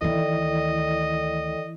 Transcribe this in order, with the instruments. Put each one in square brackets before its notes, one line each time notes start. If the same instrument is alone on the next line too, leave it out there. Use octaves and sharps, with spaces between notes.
[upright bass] D2 D#3 [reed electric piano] E3 E4 [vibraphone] A4 D5 G5 [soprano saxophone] D#5